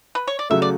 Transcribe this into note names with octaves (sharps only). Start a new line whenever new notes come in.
B4
C#5
D5
C#3 F#3 A3 E5
D5